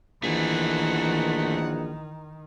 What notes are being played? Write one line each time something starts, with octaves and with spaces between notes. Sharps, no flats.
A#1 D#3 E3 A3 G#4 F#5